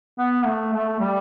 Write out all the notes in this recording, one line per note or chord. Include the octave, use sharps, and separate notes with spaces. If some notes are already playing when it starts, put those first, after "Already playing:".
B3
A3
A3
G3